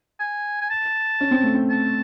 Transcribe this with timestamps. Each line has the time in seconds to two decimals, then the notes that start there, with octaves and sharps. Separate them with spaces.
0.20 G#5
0.62 G#5
0.70 A5
1.21 C#4
1.31 C4
1.43 A3
1.54 C4
1.70 A5